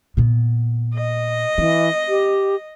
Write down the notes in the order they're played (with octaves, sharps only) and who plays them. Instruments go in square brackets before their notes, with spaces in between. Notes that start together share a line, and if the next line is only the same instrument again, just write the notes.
[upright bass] A#2 B3
[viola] D#5
[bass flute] E3 [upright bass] C4
[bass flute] G4